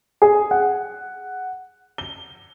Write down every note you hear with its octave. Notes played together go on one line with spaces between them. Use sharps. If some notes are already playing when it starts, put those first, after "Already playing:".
G#4
F#5
G7